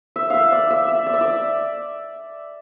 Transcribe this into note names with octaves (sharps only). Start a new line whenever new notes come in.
E5
E5 F5
D5
E5
E5
D5
E5
D5